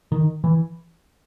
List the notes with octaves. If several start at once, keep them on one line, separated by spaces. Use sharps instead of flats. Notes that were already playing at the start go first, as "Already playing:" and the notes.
D#3
E3